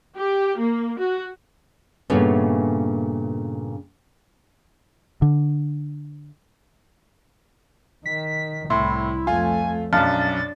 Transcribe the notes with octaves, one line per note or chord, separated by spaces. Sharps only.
G4
A#3
F#4
G2 A#2 C#3 A3 B3 C#4
D3
D#3 B6
C2 A2 E4 C6
F2 A3 F4 G#5
B1 F#2 D4 F5 A5 F6 A6